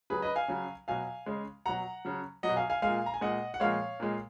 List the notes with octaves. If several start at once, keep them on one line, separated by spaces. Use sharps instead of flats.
C#3 F#3 G#4 B4
B4 D#5
F5 G#5
C#3 F#3
B2 F#3 F5 G#5
C#3 G#3
B2 F#3 F#5 A#5
C#3 F#3
F#3 D#5 F#5
B2
F5 G#5
F5 G#5
A#2 G#3 F5 G#5
A#5
G#5
A#2 G#3 D#5 F#5
F#5
A#2 F3 G#3 C#5 F5
A#2 G#3